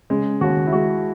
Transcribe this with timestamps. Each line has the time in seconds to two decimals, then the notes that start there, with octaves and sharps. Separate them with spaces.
0.10 C#3 G#3
0.41 D#2 F#4
0.67 E4
0.73 G#3 F#4